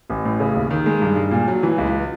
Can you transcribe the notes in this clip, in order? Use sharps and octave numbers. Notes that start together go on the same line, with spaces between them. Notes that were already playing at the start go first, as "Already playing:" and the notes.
A1
A2
C#3
D#2
D#3
G#3
G2
G2
A#2
F#3
E3
C#2